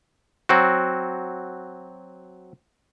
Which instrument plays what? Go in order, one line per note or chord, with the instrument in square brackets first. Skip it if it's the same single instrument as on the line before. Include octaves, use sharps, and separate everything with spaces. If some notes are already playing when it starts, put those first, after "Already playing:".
[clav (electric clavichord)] F#3 C4 F#4